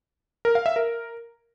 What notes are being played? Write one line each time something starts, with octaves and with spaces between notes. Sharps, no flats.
A#4
F5
E5
A#4